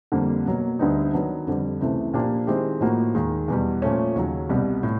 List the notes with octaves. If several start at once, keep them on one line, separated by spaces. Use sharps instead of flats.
F2 D3 G3 A#3
B2 F#3 A#3
D2 D3 G3 B3 D#4
D#3 F#3 B3 D4
F2 D3 G3
C#2 C3 E3 A3
A#2 F3 A#3 D4 G4
D#3 G#3 C4 E4 G4
A2 F3 A#3 D#4 F#4
D#2 D#3 G#3
E2 B2 G3
A#2 F3 A3 C#4
D#2 C#3 F#3
C2 B2 G3 B3
A2